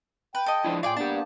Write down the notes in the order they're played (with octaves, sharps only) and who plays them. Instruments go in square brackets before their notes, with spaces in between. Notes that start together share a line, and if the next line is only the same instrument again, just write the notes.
[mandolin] B4 [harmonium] G5
[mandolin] A4 D#5
[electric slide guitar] F3 D4 E4
[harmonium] A2 F4 [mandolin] G#4 D5 [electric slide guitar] F5 G5
[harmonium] A#3 B3 [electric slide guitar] D4 G4 [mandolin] A5